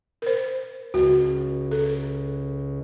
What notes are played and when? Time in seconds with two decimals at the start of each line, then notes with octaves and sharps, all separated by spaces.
0.22 A#4 C5
0.94 C#2 F#4
1.71 A4